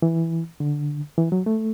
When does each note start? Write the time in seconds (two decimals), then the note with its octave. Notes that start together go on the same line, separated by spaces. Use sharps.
0.02 E3
0.60 D3
1.18 E3
1.32 F#3
1.46 A3